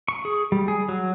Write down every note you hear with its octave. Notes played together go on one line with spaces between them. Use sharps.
C#6
G#4
G3
G#4
F#3